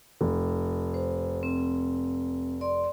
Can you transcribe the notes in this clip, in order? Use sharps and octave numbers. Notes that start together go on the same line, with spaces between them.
F1
C5
C4
D5 C6